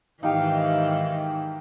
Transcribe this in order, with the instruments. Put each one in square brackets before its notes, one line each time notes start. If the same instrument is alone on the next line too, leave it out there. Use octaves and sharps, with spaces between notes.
[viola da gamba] G#2 D#3 E3 [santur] D#4 G4 [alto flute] F5